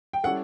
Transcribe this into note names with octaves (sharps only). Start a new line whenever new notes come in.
G5
G3 C#4 E4 A4 F#5